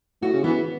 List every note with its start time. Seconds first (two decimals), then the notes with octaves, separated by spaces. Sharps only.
0.22 A2 F#4
0.33 C#3
0.44 E3 B3